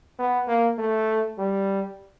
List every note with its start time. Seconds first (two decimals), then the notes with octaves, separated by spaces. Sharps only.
0.19 B3
0.48 A#3
0.79 A3
1.39 G3